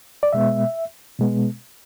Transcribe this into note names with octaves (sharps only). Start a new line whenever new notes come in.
D5
B2 G#3 B3 E5
B2 G#3 B3